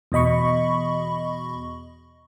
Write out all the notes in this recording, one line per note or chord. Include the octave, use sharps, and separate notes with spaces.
E2 B2 D#5 B5 C#6